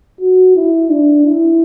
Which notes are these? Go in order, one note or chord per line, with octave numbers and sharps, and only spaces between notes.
F#4
E4
D4
E4